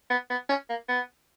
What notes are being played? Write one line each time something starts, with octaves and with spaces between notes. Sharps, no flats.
B3
B3
C#4
A#3
B3